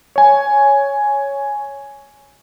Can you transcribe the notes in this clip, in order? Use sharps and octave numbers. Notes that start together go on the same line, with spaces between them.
C#5 G#5